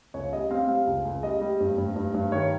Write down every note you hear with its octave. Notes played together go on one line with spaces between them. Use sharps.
C#2 C#5
G3 D#5
C4 F5
G3 F5
C#2
C#2
G3 D#5
G3
G2
G2
G2
G2
D#3 C#5